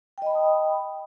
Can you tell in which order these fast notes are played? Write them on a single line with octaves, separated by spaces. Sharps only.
G5 D#5 B5 A5 D#6